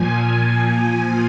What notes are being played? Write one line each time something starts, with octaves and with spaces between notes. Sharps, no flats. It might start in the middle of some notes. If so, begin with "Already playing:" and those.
Already playing: A#2 F3 G#5
G#5